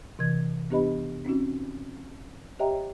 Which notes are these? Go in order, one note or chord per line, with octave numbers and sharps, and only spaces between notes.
C3 E3 G#6
B3 D4 G4 B4 D#5 B5
C4 C#4 D#4 F#4
G4 C#5 D#5 E5 G5 A#5